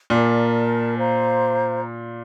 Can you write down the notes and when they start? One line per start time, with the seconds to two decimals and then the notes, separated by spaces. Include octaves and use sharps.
0.10 A#2 A#4 D5 A5
0.97 C5 F5 A#5